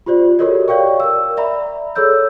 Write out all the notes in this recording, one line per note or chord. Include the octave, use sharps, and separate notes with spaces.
F4 G4 C5 D5
F#4 G4 A4 A#4 C#5 D#5
C#5 D5 F5 G5 C#6
A#4 E6
D5 E5 A#5 B5
G#4 A4 C#5 E6 G6